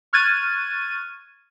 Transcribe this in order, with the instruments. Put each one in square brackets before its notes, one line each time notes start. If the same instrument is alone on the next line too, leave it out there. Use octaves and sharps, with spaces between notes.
[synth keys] C#6 F6 F#6 G#6 A6 D#7